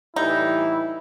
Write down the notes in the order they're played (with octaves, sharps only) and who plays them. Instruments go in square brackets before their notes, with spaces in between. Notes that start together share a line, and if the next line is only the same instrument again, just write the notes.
[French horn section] A2 E3 G3 [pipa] D#4 [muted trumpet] E4